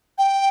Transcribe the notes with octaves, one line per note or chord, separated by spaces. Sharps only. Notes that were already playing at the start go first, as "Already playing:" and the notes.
G5